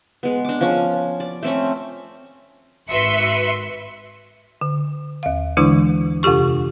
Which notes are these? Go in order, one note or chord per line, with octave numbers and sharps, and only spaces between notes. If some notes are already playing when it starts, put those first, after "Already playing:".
G#3 B3
D4 D6
F3 C#4
D5
A3 C4 C#4
G#1 F#4 B4 E5 C6 C#7
D3
D#2 F5
D3 E3 G#3 D4 E4
F2 C3 F4 G4 C#6